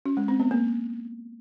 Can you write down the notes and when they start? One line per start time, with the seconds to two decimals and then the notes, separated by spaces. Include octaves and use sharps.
0.06 C#4
0.17 G#3
0.28 C4
0.40 B3
0.51 A#3